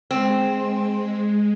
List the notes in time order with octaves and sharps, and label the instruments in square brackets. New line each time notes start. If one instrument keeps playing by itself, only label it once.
[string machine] G#3 [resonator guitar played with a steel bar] C4